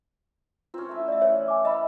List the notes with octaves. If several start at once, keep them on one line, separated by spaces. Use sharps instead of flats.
C4 C#4 F4
A3 E4
D5 E5
E3 C#5
G#5 D6
D#5 E5 F#5 B5